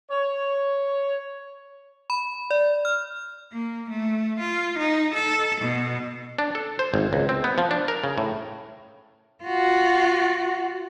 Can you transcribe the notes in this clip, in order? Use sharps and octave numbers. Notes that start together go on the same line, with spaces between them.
C#5
B5
D5
F6
A#3
A3
F4
D#4
A4
B2
D4
A4
C5
G#1
C#2
C4
B3
F3
D4
A#4
C#3
A2
F4 F#4